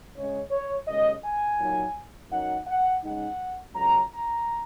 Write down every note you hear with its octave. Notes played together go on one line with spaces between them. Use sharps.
C#3 G#3 C#4 C#5
C#5
D#2 C#3 G#3 D#5
G#5
A#2 F#3 D#4
F#2 F#3 D#4 F#5
F#5
C#3 G#3 D#4 F#5
C#2 C#3 F#3 A#5
A#5